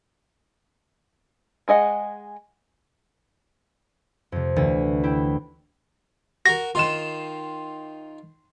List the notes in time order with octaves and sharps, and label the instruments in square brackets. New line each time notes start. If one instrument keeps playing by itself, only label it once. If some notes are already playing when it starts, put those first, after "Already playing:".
[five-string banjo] G#3 G#4 D#5 F#5
[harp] F2 C3
D2 E3 A3 A6
E4 G5
[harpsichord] F#4 A#4 [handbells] A#6
[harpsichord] D#3 F4 [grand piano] C6 E7